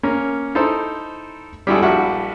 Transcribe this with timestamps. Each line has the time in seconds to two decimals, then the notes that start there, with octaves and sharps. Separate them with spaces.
0.03 A#3 C#4
0.55 D#4 E4 A4 C5
1.67 G3 G#3 E4 F#4 G#4 A4
1.82 A#1 G3 E4 F#4 E5 F#5